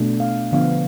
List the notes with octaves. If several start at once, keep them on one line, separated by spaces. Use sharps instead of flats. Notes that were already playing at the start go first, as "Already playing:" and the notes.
Already playing: B2 A3 D4
F5
D3 F3 B3 D4 F5